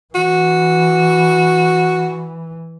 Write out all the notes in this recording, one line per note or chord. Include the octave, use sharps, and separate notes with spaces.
E3 F#4